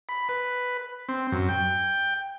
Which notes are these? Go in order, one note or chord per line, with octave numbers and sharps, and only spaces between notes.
B5
B4
C4
F#2
G5